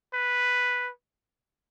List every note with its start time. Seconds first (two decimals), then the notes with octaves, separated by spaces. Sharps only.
0.13 B4